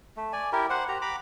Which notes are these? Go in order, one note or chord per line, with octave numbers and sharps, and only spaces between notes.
A3
D5 G#5
E4 G4 A#4
C5 F#5
G4 A#5
A#5 B5 D6